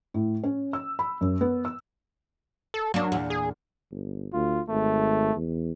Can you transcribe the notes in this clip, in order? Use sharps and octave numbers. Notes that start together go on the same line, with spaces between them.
A2
C#4
E6
B5
F#2
B3
E6
A4
F#3 A#3 D4
E2 A#2
G#4
G1
D2 F4
G#1 A3
E2